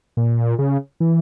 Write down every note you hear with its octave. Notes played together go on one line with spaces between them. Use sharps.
A#2
C#3
E3